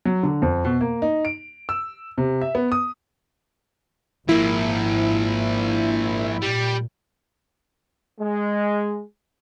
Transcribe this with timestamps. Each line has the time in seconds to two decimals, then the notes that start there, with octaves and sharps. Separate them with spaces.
0.05 F#3
0.23 D3
0.42 F2
0.65 B2
0.81 A#3
1.02 D#4
1.25 D7
1.69 E6
2.18 C3
2.41 E5
2.55 B3
2.72 D#6
4.29 G#1 F3 A#3 E4
6.42 A#2 G3
8.21 G#3